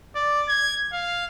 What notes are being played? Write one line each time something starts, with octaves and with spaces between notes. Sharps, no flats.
D5
G#6
F5